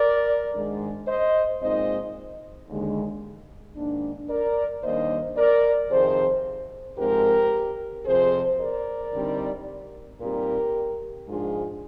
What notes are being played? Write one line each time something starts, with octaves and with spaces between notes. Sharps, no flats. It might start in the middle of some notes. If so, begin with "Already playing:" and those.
Already playing: A#4 D5
G#2 D#3 G#3 D4
C5 D#5
A#2 G#3 C4 D#4 C5 D#5
D#2 D3 G#3
G#2 D#3 A#3 D4
A#4 D5
D#2 D#3 G3 A#3 D4 C5 D#5
A#4 D5
F2 C3 D#3 G#4 C5
G#2 F3 G#3 C4 G4 A#4
F2 C3 F3 G#4 C5
A#4 D5
D3 G3 C4 D#4
A#2 G3 C4 D#4 G4 A#4
G#2 F3 G#3 D4 F4 G#4